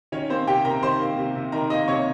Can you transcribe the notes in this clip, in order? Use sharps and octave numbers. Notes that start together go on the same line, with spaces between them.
D#3 C#4 C#5
A#3 C4 C5
C3 G4 G5
C3 A#4 A#5
D#3 C5 C6
A#3
C3
C3
D#3 A#4 A#5
A#3 D#5 D#6
C3 C#5 C#6